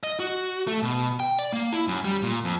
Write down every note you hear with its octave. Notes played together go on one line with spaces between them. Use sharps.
D#5
F#4
A3
B2
G5
D5
A#3
E4
F#2
G3
A#2
F2